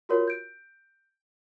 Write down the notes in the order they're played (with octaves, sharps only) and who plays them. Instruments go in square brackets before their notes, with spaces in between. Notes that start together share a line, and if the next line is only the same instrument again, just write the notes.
[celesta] F4 F#4 A#4 C#5
G6 D7